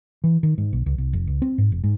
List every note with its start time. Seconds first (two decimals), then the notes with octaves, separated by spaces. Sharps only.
0.24 E3
0.43 D#3
0.58 G#2
0.73 B1
0.86 C#2
0.98 C2
1.13 F1
1.27 C#2
1.42 C4
1.58 G#2
1.72 F1
1.84 G#2